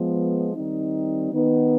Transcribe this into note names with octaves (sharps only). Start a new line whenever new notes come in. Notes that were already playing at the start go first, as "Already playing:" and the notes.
Already playing: F3 G#3 B3
D#3 G3 C4 D#4
D#3 B3 D#4